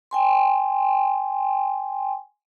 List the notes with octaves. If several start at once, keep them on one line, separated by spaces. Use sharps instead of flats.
G5 G#5 C6